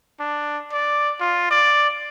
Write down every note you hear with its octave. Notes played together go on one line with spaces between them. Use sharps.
D4
D5
F4
D5